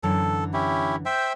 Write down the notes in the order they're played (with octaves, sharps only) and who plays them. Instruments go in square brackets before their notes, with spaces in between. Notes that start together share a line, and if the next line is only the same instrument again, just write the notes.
[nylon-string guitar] F#2 D3 E3 [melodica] A4
[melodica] C#4 E4 G4
C5 E5 G5